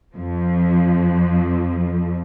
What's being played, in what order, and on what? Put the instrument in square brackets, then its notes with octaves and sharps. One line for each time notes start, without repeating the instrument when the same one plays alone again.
[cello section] F2 F3